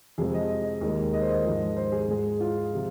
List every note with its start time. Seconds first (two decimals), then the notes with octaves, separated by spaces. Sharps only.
0.18 F2 C3 F3 G#3 G#4
0.34 D#5
0.49 D#5
0.81 D#2 D#3 G#3
1.13 D#5
1.21 C5
1.29 D#5
1.44 G#2 F3 G#3
1.77 C5
1.92 G#4
2.08 G#2 G#3
2.40 F4
2.74 C3 F3